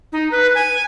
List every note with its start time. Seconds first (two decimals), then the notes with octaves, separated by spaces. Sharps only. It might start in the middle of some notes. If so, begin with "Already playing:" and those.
0.12 D#4
0.31 B4
0.55 G#5